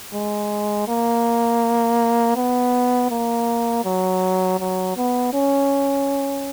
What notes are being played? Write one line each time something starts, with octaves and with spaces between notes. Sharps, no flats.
G#3
A#3
B3
A#3
F#3
F#3
B3
C#4